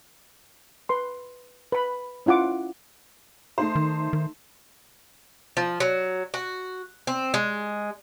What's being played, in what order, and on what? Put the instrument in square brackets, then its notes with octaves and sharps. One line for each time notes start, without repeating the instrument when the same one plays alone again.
[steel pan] B4 C6
B4 B5
C#4 E4 F4 F#5 D6
[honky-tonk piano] A3 D#4 C5
[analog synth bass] D#3
D#3
[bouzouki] F3
F#3
F#4
C4
G#3